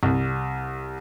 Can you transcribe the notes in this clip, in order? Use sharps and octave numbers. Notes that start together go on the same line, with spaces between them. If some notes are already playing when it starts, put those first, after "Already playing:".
C2